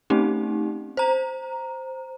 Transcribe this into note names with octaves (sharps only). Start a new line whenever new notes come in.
A3 C4 C#4 D#4 G4
C5 A#5